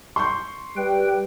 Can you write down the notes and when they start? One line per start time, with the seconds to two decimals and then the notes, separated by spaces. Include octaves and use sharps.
0.16 C6 C#6 G6
0.76 G3 B4 G5